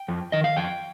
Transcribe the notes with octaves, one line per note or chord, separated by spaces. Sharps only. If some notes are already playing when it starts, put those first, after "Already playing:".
Already playing: G5
F2
D#3 D#5
F5
F2 G5